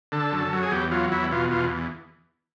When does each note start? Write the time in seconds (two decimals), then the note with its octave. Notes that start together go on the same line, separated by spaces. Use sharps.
0.12 D3 A4
0.33 F#2
0.53 F#3
0.63 G#4
0.72 E2 G4
0.92 F#3 F4
1.12 E2 E4
1.32 B2 F4
1.51 E2 F4